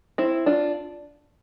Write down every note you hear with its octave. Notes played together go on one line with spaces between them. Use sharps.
C4 E4
D4 F4